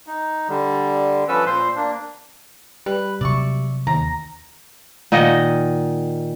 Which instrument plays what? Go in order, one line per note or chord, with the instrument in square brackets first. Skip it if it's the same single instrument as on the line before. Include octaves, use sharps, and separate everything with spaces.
[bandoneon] D#4
D3 G3
F3 C#4 A4 B4 E6
A#2 C5 C6
A#3 D4
[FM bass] G3 [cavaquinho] B4
[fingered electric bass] C3 F#3 [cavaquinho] D5 E5 C#6
[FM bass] D#2 [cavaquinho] A#5
[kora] A#2 D#3 D#5 F#5